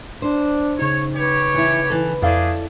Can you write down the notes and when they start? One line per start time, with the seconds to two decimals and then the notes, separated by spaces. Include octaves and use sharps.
0.22 D4 C5
0.79 C#3 D#4 C#5
1.14 G4 B4 C#5
1.54 E3 E4
1.90 E3 A4
2.22 F2 A3 D4 E4 G#4 A4 D5 F5